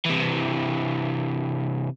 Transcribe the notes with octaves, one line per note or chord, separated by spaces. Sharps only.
C3 E3